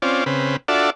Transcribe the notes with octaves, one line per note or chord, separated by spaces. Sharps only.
C4 C#4 F4 D5
C#3 C4 B4
D4 F4 F#4 A4 D5 E5